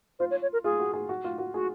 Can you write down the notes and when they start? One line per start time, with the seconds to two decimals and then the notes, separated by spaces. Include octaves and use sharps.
0.19 F4 C5
0.31 C#5
0.42 C#5
0.53 A#4
0.64 F4 G#4
0.80 F#4
0.93 G#4
1.09 F#4
1.24 F4
1.38 F#4
1.54 F#4 G#4